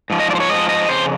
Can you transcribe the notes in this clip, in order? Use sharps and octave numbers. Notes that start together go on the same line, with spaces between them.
G#2 F3
D#5
D5
C5
C#5
G#2 F3 D#5
D#5
F2 C#3 C5